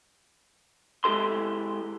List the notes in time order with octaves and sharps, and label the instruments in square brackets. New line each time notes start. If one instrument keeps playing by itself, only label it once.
[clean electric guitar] G#3 E4 G4 A4 C6